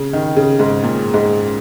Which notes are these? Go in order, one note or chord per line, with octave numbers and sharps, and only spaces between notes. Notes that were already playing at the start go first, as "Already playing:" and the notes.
Already playing: C#3
D#3
C#3
G#2
A#2
G#2